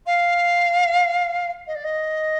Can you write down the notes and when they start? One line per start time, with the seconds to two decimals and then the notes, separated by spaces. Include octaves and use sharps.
0.06 F5
1.67 D#5
1.75 D5
1.84 D#5